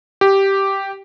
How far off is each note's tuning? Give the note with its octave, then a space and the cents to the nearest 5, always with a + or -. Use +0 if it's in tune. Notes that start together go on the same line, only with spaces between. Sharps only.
G4 -5